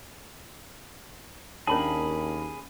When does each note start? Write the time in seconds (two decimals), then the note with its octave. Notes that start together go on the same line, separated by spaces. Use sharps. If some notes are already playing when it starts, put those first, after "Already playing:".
1.67 D#2 A#3 C#4 D4 G#4 A5 B5